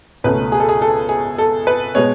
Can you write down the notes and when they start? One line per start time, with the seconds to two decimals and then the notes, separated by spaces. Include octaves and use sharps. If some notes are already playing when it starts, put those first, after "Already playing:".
0.24 C#2 B2 A3 C#4 B4
0.52 G#4
0.60 A4
0.69 G#4
0.82 A4
1.09 G#4
1.38 A4
1.67 B4
1.95 B2 G#3 B3 C#5